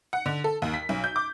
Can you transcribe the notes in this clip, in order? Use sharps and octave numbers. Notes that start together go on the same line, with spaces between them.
F#5
D3
A4
D#2
B6
B1
G6
D6